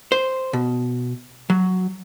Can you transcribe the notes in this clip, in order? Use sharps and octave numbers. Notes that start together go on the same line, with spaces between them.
C5
B2
F#3